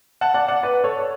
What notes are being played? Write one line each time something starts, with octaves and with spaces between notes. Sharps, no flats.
F#5 A5
D5 F#5
D5 F#5
B4 D5
A4 C#5